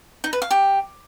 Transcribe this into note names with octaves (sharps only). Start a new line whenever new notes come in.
D#4
B4
F5
G4